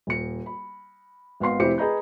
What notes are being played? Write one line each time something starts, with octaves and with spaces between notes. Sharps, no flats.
D#1 C#7
B5
G#1 B3 F5 C6 C7
F1 C4 E4 G4 C5 C#7
G#4 B4 D#5 A#5 B5 G6